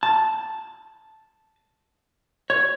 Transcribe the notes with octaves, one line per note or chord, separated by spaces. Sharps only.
A5
C#5